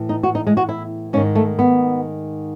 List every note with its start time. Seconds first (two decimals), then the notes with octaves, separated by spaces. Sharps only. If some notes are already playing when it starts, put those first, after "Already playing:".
Already playing: A2 E3
0.09 D#4
0.23 F#4
0.35 D#4
0.47 G#3
0.57 F#4
0.69 E4
1.13 G#2 C#4
1.17 D#3
1.35 A3
1.59 B3